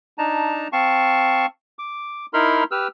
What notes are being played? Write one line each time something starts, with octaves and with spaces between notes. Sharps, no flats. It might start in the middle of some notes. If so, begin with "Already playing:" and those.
D4 D#4 A5 A#5
C4 F5 A5 C#6
D6
D#4 E4 A#4 B5 C6 F6
G4 B4 E6 F6